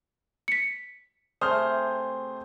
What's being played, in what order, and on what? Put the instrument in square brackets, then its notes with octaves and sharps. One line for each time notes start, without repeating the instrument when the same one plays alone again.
[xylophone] B6 C#7
[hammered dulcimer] C3 A3 G#4 [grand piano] C5 F6 G6 [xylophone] D#6